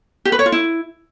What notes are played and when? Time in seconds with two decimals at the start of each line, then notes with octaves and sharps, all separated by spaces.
0.25 G4
0.32 B4
0.39 C#5
0.46 F4
0.52 E4